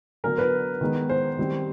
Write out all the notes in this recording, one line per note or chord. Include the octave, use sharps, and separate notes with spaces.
D3 F#3 B3 A#4
B4
D#3 G#3 B3 D#4
C5
D#3 G3 C4